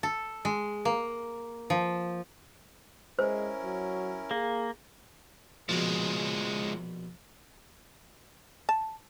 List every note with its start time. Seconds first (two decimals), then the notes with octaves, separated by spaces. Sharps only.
0.03 A4
0.45 G#3
0.85 A#3
1.70 F3
3.19 G#3 C#4 E4 A#4 C5
3.64 F#3
4.31 A#3 G#4
5.69 A#1 B2 F3 G#3 B5
8.69 A5